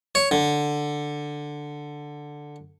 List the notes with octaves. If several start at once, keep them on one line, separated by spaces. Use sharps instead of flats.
C#5
D3